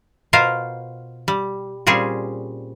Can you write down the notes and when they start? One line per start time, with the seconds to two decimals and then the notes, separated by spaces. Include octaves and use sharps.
0.33 B2 F4 A#4 C5 F5
1.28 G3
1.87 A#2 G3 C4 C#4 G#4